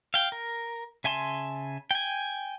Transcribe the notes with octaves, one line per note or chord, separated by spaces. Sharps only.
F5 G5
A#4
C#3 E5 G#5 A5 C6
G5 G#5